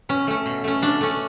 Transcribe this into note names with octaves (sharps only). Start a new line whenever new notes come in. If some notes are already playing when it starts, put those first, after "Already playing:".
B2 C#4
A3 C#4
B2
A3 C#4
B2 D4
A3 C#4